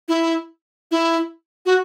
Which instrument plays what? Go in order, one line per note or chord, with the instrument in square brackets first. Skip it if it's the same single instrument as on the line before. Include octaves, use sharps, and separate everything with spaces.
[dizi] E4
E4
F#4